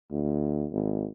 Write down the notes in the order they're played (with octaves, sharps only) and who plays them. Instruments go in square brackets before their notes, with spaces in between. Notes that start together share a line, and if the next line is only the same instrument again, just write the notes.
[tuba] D2
G#1